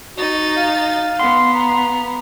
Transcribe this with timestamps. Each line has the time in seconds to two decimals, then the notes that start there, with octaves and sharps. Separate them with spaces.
0.17 D#4 F#4 A6
0.57 F5
1.19 B3 F#5 C6
1.54 A#5